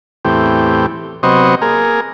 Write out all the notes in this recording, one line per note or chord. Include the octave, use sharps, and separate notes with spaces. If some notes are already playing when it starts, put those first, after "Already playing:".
E2 A2 C4 G4
C3 F#3 B3 C5 D#5 C#6
A#3 G#4 A#4